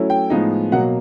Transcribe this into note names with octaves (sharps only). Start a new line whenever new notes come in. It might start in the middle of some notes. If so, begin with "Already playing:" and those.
Already playing: F#3 A3 C#4 E4
G5
A2 F3 G#3 B3 D#4
B2 F#3 A#3 F#5